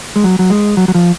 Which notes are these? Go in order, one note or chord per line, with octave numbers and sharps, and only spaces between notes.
G#3
F#3
F#3
G#3
F#3
F#3
F3